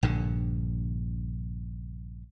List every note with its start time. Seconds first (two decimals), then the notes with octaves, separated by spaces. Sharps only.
0.03 A#1 G2 D3